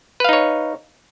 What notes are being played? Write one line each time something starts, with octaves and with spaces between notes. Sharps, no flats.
D#4 B4 C#5 F5